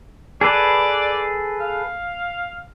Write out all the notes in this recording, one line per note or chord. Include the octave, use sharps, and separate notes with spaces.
G#4 A4 B4 D5
F5